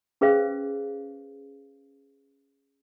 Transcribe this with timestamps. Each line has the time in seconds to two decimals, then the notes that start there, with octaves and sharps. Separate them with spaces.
0.21 C#4 G#4 B4 C5 F5